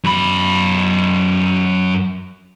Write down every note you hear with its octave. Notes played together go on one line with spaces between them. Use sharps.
F#2 B5